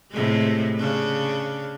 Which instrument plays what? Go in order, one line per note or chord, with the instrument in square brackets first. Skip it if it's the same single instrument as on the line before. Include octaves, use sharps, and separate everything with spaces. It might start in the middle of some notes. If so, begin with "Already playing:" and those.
[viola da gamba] A2 C3 G#3
C#3 D4